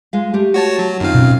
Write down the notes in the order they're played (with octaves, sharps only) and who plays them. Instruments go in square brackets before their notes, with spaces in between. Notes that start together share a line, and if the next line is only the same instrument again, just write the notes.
[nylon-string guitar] G#3 F4 F5
A3 G4
[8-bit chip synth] F#4 C#5 A5
F#3
[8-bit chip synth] F#2 F5 [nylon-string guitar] D#3 C4 F4
[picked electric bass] B2 C#4